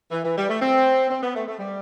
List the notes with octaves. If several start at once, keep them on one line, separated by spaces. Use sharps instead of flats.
E3
E3
G3
A3
C4
C4
B3
A3
A3
G3